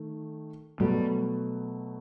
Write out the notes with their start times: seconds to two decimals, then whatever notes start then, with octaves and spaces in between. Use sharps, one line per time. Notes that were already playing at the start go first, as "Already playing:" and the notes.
Already playing: D#3 A3
0.80 B2 F#3 G3 A3